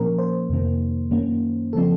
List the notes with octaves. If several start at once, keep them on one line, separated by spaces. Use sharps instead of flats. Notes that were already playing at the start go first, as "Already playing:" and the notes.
Already playing: A#2 F3 A#3 C#4 A#4
C5
F2 C3 D#3 A#3
F#2 D#3 A#3 C#4
C#3 F3 C4 A4